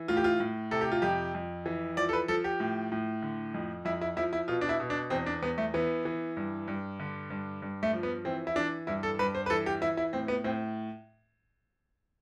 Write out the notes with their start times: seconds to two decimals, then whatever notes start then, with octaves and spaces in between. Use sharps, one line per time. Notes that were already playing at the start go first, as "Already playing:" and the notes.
Already playing: E3
0.08 A2 F4
0.17 G4
0.24 F4
0.40 A2
0.71 C3 A4
0.81 G4
0.92 F4
1.02 F2 G4
1.34 F2
1.66 E3
1.97 F3 D5
2.09 A4
2.13 B4
2.28 F3 A4
2.44 G4
2.60 A2
2.92 A2
3.22 D3
3.54 F2
3.85 F2 E4
4.01 E4
4.17 F3 E4
4.33 E4
4.48 B2 F4
4.61 D4
4.69 E4
4.80 B2
4.90 D4
5.10 E2 C4
5.26 D4
5.43 E2 B3
5.58 A3
5.74 E3 B3
6.05 E3
6.37 G2
6.68 G2
7.00 D3
7.30 G2
7.62 G2
7.83 A3
7.93 F3
8.03 B3
8.25 E3 C4
8.47 E4
8.56 E3 D4
8.87 G2 E4
9.03 A4
9.19 G2 B4
9.35 C5
9.46 B4
9.50 E3 A4
9.66 G4
9.82 E3 E4
9.97 E4
10.13 A2 C4
10.28 B3
10.44 A2 C4